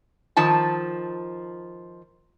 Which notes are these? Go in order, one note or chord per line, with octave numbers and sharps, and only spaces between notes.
D#3 F3 A5